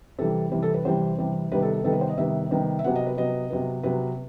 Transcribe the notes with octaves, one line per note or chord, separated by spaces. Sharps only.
C3 E3 G3 A4
C3 E3 G3
A4
B4
C3 E3 G3 C5
C3 E3 G3
C3 D#3 G3 B3 B4
A4
A4
C3 D#3 G3 B3 A4
B4
C5
D#5
C3 D#3 G3 B3 E5
C3 D#3 G3 B3
E5
C3 F#3 B3 F#5
D#5
B4
C3 F#3 B3 D#5
C3 F#3 B3
C3 F#3 B3 B4